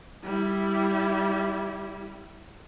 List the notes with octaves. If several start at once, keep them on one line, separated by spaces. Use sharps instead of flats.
G3 E4